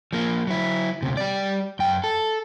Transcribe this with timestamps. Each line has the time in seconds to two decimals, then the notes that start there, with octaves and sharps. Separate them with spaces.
0.13 F3 A#3
0.47 F#3 E4
1.02 D2 C3
1.17 G3 D5
1.79 F#2 G5
2.04 A4